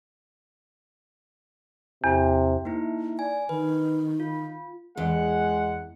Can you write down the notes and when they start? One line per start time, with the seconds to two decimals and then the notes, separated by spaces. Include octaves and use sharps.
2.04 E2 C3
2.65 A#3 D#4 E4
3.19 D5 G#5
3.49 D#3 B4
4.20 F4
4.97 E2 G#3 F#5